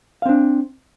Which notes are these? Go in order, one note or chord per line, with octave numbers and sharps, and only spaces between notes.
C4 D4 F5